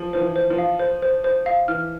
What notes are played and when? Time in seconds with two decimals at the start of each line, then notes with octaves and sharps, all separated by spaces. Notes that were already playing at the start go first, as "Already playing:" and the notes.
Already playing: F3
0.13 F3 C5
0.21 E3
0.36 C5
0.50 F3
0.58 F5
0.79 C5
1.02 C5
1.24 C5
1.46 F5
1.68 E3 F6